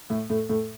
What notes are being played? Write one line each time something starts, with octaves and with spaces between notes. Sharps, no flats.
A2 A3
A2 A3
A2 A3